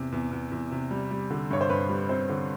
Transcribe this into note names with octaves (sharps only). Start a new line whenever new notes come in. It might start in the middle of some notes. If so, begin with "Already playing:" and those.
Already playing: E2 C3
E2
E2
E2
C3
G3
G3
D3
G2 C#5
C5
G2 B4
G3
C4 C5
D3